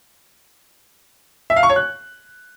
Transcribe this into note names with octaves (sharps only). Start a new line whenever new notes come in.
E5
F5
C#6
C#5
F#6